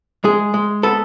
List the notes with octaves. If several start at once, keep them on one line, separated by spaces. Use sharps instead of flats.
G#3 G#4
G#3
B3 A4